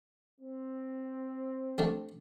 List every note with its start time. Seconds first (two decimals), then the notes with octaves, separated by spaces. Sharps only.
0.40 C4
1.78 A3 D4 G4